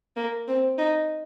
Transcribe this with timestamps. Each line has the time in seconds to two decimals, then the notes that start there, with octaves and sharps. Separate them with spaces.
0.16 A#3
0.48 C4
0.78 D#4